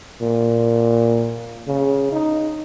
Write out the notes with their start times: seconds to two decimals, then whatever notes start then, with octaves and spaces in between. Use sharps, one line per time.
0.21 A#2
1.67 C#3
2.12 D#4